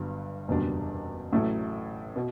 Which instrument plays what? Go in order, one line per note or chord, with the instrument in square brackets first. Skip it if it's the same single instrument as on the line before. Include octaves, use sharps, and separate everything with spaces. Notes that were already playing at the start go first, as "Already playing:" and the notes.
Already playing: [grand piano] G1 G2 F#3 B3
F#1 E2 B2 G3 D4
A1 A2 F#3 A3 E4
B2